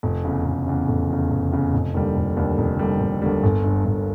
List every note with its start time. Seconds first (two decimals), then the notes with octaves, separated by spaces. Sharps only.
0.03 F1
0.25 E2 C#3
0.46 F1
0.67 E2 C#3
0.88 F1
1.10 E2 C#3
1.31 F1
1.52 E2 C#3
1.74 F1
1.94 D#2 D3 G3
2.16 F1
2.37 D#2 D3 G3
2.58 F1
2.79 D#2 D3 G3
3.00 F1
3.22 D#2 D3 G3
3.43 G1
3.64 G2 D3
3.85 G1